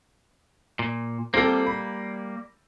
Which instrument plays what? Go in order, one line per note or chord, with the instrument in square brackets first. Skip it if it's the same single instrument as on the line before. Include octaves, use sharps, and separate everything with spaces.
[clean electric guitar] A#2
[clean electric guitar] G3 A#3 [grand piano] C4 F4 A4
[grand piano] B5